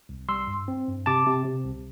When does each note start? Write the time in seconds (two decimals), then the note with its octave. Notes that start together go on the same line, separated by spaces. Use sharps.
0.09 C2
0.29 G3 C6 E6
0.47 G2
0.68 C4
0.88 G2
1.06 C3 A5 D6
1.27 C3
1.45 C3
1.65 C2